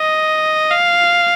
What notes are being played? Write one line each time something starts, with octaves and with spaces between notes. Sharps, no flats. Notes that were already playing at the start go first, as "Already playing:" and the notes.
Already playing: D#5
F5